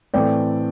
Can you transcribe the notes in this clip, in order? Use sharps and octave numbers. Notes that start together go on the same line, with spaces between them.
A2 E3 A3 C4 D5 G5